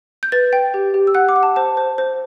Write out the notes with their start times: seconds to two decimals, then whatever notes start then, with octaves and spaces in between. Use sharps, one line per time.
0.23 G6
0.32 B4 A6
0.53 G5
0.74 G4
0.94 G4
1.07 E6
1.15 F#5 F#6
1.29 D6
1.36 F#5
1.43 A5
1.56 C5 A5
1.77 C5
1.98 C5